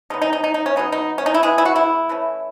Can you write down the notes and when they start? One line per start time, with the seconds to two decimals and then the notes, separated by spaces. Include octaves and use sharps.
0.10 C#3 G#3 B3 D#4
0.22 D#4
0.33 D#4
0.44 D#4
0.54 D#4
0.66 C#4
0.76 B2 F#3 B3 D#4
0.92 D#4
1.18 C#4
1.26 D#4
1.34 E4
1.43 E3 G#3 B3 G#4
1.58 E4
1.65 F#4
1.76 E4
2.09 E3 A3 C#4